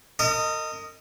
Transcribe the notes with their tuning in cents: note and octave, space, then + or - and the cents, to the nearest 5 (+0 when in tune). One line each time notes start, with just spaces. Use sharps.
A#4 -40 D#5 +0